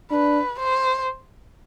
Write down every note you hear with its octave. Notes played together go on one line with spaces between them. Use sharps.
D4 B4
C5